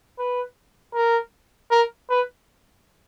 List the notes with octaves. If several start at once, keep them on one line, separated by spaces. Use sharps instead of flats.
B4
A#4
A#4
B4